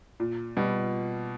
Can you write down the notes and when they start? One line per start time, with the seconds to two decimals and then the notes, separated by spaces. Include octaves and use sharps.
0.20 A#2
0.57 B2 G3